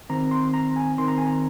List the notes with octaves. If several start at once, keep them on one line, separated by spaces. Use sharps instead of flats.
D#3 C4 A#5
C6
A#5
G#5
D#3 C4 C6
A#5
G#5
A#5